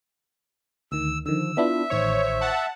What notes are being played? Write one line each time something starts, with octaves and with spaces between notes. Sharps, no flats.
D2 D#3 E6
D3 D#3 F3 E6
B3 D4 E4 F4 E5
A1 D#3 C5 C#5 C#6
F#5 A5